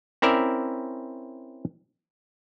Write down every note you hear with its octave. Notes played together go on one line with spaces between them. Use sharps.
C4 C#4 E4 A#4 D5 E5